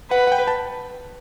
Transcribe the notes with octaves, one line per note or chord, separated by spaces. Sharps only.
B4 F#5
F#5
G5
A5